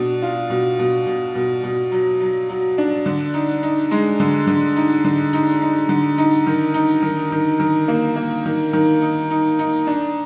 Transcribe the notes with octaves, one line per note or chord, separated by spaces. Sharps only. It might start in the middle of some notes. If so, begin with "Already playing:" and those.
Already playing: B2 D4
F4
B2
B2
B2
B2
B2
F#3
F#3
F#3
D4
D3
D#4
D#4
G#3
D3
D3
D#4
D3
D#4
D#4
D3
D#4
D#3
D#4
D#3
D#3
D#3
A#3
A#3
D#3
D#3
D#4
D#4
D#4
D4